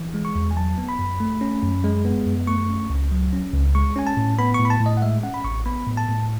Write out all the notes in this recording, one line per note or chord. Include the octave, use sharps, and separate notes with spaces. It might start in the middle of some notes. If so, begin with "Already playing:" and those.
Already playing: E3
G#3
C#6
E2
G#5
F#3 A5
B3
B5
F#2
A3
C#4
F#2
G#3
B3
F#2
A3 C#6
C#4
C#2
F#3
C#4
C#2
G#3 C#6
C#4 G#5
A5
A2
B3 B5
C#6
A2
B5
A5
A2
D#5
F#5
G#3 E5
C#4 F#5
B5
A1 C#6
B3 B5
A2
A5
A2